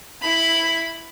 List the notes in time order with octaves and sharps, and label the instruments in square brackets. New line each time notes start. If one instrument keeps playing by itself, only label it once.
[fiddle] E4 B5